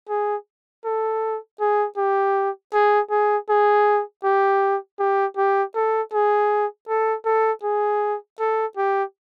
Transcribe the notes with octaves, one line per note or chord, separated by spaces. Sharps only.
G#4
A4
G#4
G4
G#4
G#4
G#4
G4
G4
G4
A4
G#4
A4
A4
G#4
A4
G4